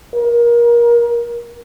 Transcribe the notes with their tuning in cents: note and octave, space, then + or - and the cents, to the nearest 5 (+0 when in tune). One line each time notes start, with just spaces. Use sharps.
A#4 +25